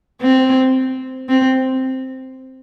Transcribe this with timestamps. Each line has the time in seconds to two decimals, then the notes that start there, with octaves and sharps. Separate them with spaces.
0.21 C4
1.29 C4